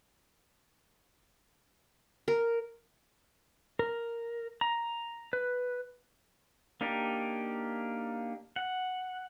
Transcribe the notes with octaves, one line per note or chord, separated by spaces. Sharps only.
A#4
A#4
A#5
B4
A#3 D4 D#4 G4
F#5